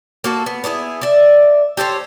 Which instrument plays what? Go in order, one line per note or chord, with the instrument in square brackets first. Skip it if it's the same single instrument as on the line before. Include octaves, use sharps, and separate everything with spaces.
[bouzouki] A#3 F#4 A4
B3
B3 D4 E4 G#4
D5 E5
G4 A4 C5 C#5